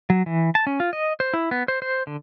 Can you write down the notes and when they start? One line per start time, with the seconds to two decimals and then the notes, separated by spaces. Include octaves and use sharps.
0.10 F#3
0.26 E3
0.55 A5
0.67 C#4
0.80 F4
0.93 D#5
1.20 C5
1.34 E4
1.51 B3
1.68 C5
1.82 C5
2.07 D3